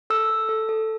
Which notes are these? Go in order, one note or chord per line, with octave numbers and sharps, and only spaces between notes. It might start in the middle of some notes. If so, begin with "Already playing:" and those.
A4 E6
A4
A4
A4